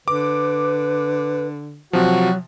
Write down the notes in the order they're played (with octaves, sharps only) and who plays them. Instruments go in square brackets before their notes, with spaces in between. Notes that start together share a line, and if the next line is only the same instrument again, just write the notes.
[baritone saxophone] D3 [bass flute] B4 [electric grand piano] D6
[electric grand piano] C3 F3 [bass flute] F#3 [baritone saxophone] F#4